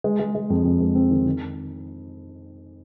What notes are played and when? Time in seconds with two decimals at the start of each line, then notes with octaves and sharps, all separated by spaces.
0.04 G#3
0.20 G#3
0.35 G#3
0.50 F2
0.65 F2
0.80 G#3
0.95 C4
1.10 D#3
1.26 D#3